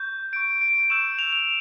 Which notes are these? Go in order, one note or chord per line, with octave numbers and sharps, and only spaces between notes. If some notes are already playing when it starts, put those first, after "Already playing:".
Already playing: C#6 G6
C#6 G6 D7
D7
C#6 E6 G6 E7
F7
F7